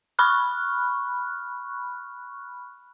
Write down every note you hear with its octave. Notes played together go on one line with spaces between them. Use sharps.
B5 C#6 F6 F#6